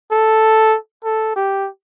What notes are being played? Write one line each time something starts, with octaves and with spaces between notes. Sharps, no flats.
A4
A4
G4